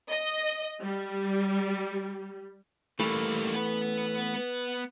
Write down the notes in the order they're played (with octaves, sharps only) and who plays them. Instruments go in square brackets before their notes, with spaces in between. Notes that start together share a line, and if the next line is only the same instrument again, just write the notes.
[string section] D#5
G3
[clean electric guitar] E3 A3 [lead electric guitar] G3 A#3
[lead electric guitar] B3 B4